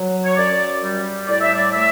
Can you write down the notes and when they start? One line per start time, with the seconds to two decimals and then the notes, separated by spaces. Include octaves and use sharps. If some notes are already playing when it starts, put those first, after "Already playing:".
Already playing: F#3
0.25 C#5
0.37 F#2 D5
0.82 G3
1.28 A2 D5
1.41 E5
1.54 D5
1.73 A3 E5